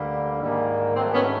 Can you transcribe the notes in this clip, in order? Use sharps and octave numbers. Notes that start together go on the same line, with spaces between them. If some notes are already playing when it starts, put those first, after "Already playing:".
Already playing: D2 D3 G3 A#3
G#2 D#3 G3 A#3
G#2 D#3 F#3 A3 C4
B3 C#4